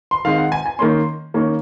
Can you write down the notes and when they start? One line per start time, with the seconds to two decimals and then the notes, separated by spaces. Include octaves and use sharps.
0.11 C6
0.25 D#3 G#3 C4 F5
0.38 F#5
0.52 G#5
0.66 G#5
0.79 D#3 A#3 C#4 C6
1.34 D#3 A#3 C#4